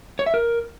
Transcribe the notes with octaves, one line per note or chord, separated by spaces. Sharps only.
C#5
E5
A#4